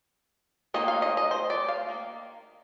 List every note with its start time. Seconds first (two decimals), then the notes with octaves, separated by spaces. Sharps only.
0.74 D#3 A#3 D#4 D#5
0.88 F5
1.02 D#5
1.17 D#5
1.31 C5
1.50 D5
1.68 F5
1.88 D#3 A#3 D#4